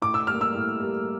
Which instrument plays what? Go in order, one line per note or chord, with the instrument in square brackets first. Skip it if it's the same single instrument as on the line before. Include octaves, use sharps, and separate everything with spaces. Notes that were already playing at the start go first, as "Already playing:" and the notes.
[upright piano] A2 D6
E6
G3 F6
A#3
E6
A2
G3 A#3